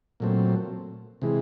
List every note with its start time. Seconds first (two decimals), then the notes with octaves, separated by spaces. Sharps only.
0.20 A#2 F#3 A3 C4
1.22 C3 E3 G#3